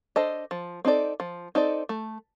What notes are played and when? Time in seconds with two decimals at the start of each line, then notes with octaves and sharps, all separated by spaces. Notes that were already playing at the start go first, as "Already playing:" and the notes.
0.16 D4 A4 C5 D#5
0.51 F3
0.85 C4 D#4 A4 D5
1.20 F3
1.55 C4 D#4 A4 D5
1.89 A3